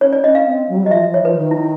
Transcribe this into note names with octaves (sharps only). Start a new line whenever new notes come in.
C#4 C#5
D5
C#4 D#5
F5
C4
F#3
G3
F#3
D#5
F3 E5
F3
C#5
F3 B4
D#3
E4